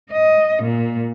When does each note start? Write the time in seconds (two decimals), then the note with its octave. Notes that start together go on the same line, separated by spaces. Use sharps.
0.11 D#5
0.63 A#2